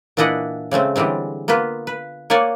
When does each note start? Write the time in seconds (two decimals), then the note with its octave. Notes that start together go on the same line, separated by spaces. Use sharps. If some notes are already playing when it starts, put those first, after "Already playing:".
0.17 A#2 E3 D4 E4 D#5 F#5
0.71 C#3 G#3 A3 C4
0.96 D3 E3 G3 G#3 C4
1.48 A#3 B3 F4 B4
1.87 B4
2.30 A#3 C#5 D5 F#5 G#5